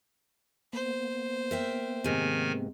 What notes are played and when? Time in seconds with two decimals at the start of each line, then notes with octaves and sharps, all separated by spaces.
0.73 A#3 B3 C5
1.51 A#4 E5 G5
2.04 G#2 C3 D#3 G#5